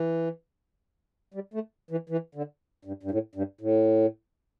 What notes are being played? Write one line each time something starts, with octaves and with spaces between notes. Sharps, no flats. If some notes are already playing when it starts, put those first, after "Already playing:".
Already playing: E3
G3
A3
E3
E3
D3
G2
G2
A2
G2
A2